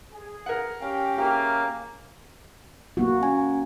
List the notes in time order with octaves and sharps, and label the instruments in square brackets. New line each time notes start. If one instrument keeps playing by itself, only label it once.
[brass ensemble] G#4
[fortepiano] A#4 F#5
[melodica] C#4 F5 [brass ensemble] G4 G5
[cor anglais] A#3 [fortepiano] G4 [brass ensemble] G#4 E5 G5
[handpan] A#3 F#4
[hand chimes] C#4 G#5